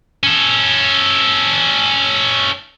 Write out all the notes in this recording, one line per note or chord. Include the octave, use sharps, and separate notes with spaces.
C#4 A4